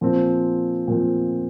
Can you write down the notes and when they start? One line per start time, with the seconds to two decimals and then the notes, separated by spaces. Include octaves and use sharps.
0.01 A#2 F3 C4
0.88 A#2 F3 C4